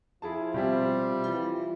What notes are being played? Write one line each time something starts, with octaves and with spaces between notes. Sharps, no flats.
F3 E4 F4 G#4 A5
B2 G3 C4 G4 E5
E3 F4